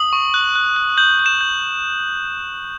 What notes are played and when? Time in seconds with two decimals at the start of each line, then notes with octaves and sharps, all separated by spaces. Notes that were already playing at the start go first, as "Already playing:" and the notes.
Already playing: D#6 F#7
0.13 C#6
0.34 F#6
0.56 F#6
0.76 F#6
0.98 G6 F#7
1.19 G6
1.26 E7
1.41 G6